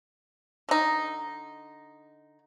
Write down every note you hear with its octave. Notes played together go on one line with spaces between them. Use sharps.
D3 D#4